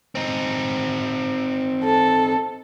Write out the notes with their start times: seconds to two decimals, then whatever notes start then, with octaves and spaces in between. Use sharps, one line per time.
0.15 C4 D#4
1.84 A4